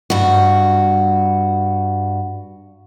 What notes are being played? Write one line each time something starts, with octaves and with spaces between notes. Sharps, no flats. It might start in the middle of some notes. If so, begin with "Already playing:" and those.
G2 F#4